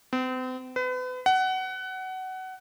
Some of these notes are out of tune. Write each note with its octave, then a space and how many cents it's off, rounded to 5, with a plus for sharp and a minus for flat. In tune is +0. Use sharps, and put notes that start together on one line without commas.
C4 -40
B4 +35
F#5 +20